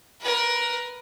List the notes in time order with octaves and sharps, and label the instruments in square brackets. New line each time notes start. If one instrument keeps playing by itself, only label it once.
[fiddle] A#4 B4